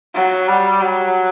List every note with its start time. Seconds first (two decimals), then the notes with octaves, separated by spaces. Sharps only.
0.14 F#3
0.48 G3
0.82 F#3